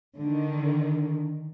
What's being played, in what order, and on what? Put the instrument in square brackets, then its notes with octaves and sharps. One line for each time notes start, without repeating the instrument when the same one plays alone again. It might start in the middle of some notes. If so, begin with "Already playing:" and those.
[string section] D3 D#3